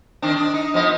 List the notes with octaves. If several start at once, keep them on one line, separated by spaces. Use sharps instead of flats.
D#3 C4 D4
D4
D#4
F3 B3 D#5